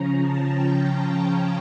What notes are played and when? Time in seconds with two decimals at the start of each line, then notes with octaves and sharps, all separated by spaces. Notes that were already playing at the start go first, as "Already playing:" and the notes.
Already playing: C#3 F3 C#4 A#5
0.22 A5
0.53 G5